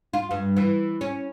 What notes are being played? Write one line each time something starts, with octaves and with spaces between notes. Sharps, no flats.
F4
G2
E3
C#4